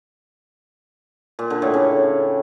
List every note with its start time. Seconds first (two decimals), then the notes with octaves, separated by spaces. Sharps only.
1.39 A#2
1.50 D3
1.62 A2
1.74 C#3